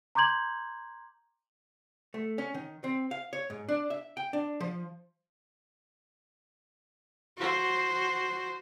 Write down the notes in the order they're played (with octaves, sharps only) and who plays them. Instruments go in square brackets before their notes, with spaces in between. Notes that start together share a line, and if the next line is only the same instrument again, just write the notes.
[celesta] A#5 C6 D6 G6 G#6 F#7
[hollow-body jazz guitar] A3
C#4
D#3
C4
F5
C#5
G#2
D4
E5
G5
D4
F3
[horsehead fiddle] F#4 C5